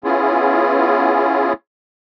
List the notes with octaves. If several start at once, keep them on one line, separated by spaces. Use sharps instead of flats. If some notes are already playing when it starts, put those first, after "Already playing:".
B3 C#4 E4 F4 G#4